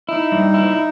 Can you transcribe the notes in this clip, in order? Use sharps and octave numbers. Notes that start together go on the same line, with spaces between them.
D#4 E4
G2
E4